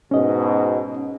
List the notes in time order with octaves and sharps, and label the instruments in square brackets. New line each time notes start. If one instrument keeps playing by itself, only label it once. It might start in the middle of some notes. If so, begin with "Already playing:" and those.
[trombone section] G#2 B2 [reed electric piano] C#4 D#5